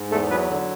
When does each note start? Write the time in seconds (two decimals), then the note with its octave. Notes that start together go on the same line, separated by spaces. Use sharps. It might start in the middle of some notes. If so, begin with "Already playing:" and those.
Already playing: G#2
0.11 E2 A3 A4
0.30 F#3 B3 B4
0.50 D3